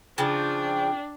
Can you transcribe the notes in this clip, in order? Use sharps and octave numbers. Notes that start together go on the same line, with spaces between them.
C#3 F3 D4 G5